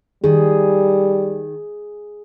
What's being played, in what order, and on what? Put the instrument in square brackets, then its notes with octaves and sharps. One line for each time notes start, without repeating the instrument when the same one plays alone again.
[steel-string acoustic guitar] D#3 [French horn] G3 [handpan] G#4